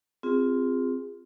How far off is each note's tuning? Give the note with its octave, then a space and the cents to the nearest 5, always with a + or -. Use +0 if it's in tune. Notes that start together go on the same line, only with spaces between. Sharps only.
C4 -5 F4 +10 G#4 -20